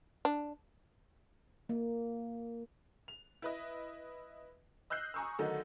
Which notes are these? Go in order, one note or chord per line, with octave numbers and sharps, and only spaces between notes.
D4
A#3
F7
E4 B4 D#5
D#5 E6 F#6 G6 C7
G#5 A#5 C#6 D#6 E6
D3 D#3 F#3 A3 D#4